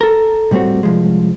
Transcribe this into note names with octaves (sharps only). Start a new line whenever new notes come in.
A4 A#4
A2 G3 A3 C4 F#4
C2 F3 G#3